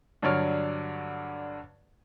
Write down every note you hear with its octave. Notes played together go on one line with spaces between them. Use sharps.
G2 D3 F#3 C#5 D5 F6